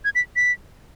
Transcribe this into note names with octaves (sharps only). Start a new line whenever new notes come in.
G#6
B6
B6